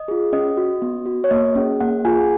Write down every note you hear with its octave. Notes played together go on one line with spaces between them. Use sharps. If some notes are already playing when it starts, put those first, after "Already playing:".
Already playing: D#5
F4 G#4
C#4 D#5
F#4
B3
F#4
C#5
A#3 D#5
C#4 G#4
A#3 F#5
F4 G#4 G#5